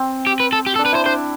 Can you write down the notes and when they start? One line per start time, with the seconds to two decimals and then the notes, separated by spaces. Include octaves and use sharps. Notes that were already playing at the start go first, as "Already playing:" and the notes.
Already playing: C4
0.27 G4
0.40 B4
0.53 A4
0.66 G4
0.76 A4
0.79 D4
0.86 B4
0.92 E4 C5
1.06 D4 C5